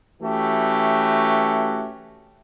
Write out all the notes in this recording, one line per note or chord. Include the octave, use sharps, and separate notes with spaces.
E3 A3 C#4 F#4 G4